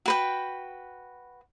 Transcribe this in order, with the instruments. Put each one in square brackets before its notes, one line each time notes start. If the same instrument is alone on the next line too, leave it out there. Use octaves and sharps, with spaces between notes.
[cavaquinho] F#4 B4 G5